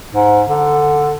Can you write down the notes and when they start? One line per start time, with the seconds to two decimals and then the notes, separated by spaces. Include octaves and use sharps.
0.15 G#2
0.48 D3